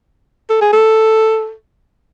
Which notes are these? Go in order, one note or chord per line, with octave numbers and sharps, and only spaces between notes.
A4
G#4
A4